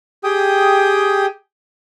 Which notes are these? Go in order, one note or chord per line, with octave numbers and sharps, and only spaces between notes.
G4 G#4 G5 D#6